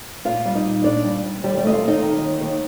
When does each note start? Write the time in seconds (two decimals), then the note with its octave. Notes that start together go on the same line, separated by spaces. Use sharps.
0.25 A#2 F4 F5
0.45 G3
0.55 D#4 D#5
0.64 A#2
0.84 A#2 D4 D5
1.04 G3
1.24 G3
1.43 D#2 G3 G4
1.58 G3 G4
1.63 A3 D#5
1.72 F4 F5
1.83 D#2 D#4 D#5
2.02 D#3
2.22 D#2
2.41 D#2